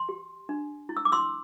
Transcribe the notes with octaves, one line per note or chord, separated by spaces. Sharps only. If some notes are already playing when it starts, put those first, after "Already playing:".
Already playing: C6
G4
D4
E4
E6
D6
C6 E6